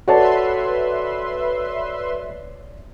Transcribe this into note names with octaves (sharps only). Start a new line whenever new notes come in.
F#4 A4 B4 C#5 D5 E5 A5 C6